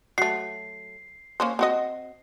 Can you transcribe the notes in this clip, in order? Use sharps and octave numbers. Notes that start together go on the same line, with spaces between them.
F#3 A3 C7
A#3 C#4 C5
C4 F#4 D#5